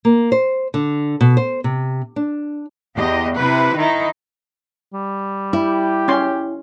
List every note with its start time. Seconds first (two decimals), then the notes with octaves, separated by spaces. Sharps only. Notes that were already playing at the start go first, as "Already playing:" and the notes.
0.05 A#3
0.32 C5
0.74 D3
1.21 B2
1.37 C5
1.64 C3
2.16 D4
2.94 E2 G4 D#5
3.36 C3 E4 B4
3.77 D#3 D#4 E4
4.93 G3
5.53 E4 G4
6.08 C#4 C6